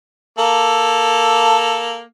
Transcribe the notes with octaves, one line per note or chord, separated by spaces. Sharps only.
A#3 A4